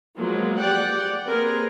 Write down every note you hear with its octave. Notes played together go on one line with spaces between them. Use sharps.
F3 F#3 G#3 A#3 B3
G4 D5 F#5 G5
A#3 C4 G#4 A#4 B4